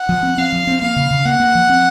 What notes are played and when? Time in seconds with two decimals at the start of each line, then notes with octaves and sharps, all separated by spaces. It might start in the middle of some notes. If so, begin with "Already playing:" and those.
Already playing: F#5
0.09 F3
0.23 C4
0.38 C4 F5
0.52 F3
0.67 C4
0.82 A#3 F5
0.96 C#3
1.11 C#3
1.25 A#3 F#5
1.40 A#3
1.55 F3
1.69 C4